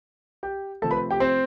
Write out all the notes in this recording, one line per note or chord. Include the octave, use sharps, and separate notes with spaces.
G4 G5
C3 F3 A3 C4 A4 A5
B4 B5
G4 G5
C4 C5